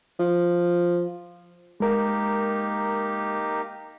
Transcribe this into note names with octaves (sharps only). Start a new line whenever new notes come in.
F3
G#3 A#3 D#4 G4 A#4